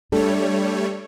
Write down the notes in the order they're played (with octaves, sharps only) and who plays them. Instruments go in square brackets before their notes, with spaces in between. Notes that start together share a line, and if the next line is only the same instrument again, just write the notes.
[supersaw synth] G3 A3 C#5 [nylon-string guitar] D4 A4